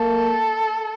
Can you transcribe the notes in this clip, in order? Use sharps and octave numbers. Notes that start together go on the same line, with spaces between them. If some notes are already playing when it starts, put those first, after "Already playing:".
Already playing: A#3 A4